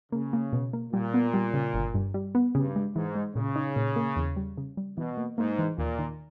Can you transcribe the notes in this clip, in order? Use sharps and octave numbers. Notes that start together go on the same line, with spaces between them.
C#3 A#3
A#3
B2
A#3
A#2 G3
B3
G3
C#3
G1
G2
G3
B3
G2 C#3
G#3
G#2 E3
G#3
A#2 C#3
D#4
A#2
A#3
E2
G3
C#3
G3
B2 E3
A#3
G#2 A#3
E3
D#2 A#2
D#3